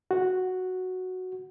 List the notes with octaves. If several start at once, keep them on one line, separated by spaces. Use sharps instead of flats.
F#4